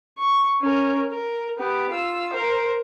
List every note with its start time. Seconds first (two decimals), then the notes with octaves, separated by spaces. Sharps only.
0.18 C#6
0.61 C#4 A#4
1.11 A#4
1.58 B3 G4
1.90 F4 E6
2.33 A#4 C5